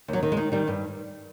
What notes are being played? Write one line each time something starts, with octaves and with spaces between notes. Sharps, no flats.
D#2 F#3
D#3
G#3
D#3
D#3 G3
G2